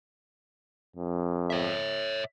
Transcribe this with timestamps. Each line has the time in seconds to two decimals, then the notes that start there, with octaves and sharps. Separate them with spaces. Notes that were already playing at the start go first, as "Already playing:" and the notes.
0.96 F2
1.50 C#5 E5